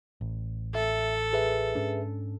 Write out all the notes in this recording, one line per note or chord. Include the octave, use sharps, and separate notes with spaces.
A1
A4 E5
G#4 B4 E5
G#2 C#4 D4